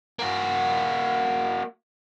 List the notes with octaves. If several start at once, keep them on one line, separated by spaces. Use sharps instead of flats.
A#3 F#4